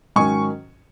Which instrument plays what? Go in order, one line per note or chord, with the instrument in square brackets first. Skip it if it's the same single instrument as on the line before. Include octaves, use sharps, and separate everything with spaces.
[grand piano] G#2 D#3 F#3 C#4 G#5 C#6